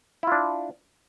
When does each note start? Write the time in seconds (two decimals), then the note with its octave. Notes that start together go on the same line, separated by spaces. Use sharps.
0.23 E4
0.27 F4
0.32 D4